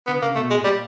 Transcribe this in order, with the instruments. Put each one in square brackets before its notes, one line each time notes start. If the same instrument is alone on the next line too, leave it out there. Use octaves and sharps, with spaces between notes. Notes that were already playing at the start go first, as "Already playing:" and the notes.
[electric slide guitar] D3 [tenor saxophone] B3
[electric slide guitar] C#3 [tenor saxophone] A#3
[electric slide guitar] B2 [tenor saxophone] A3
[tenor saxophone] G#3
[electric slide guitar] A2
[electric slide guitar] A#2 [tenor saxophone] G3